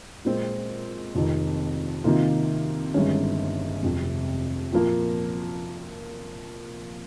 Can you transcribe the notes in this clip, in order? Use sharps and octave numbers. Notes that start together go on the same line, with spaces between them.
A#2 G#3 C4
F1 F2 D#3
C3 D#3 A#3 F4
G1 G2 D#3 G#3 C#4
F1 F2 C3
A#2 F3 A#3